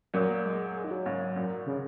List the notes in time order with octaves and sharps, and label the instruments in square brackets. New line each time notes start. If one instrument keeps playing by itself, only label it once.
[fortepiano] F#2 A#2 [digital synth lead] F#3
[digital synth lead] A#3
G#3
G#3
D#3
F#3
[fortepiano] G#2 C#3
F#2 A#2
[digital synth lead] C#3